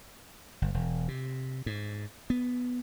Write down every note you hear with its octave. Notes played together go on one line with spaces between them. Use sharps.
G1
E1
C3
G#2
B3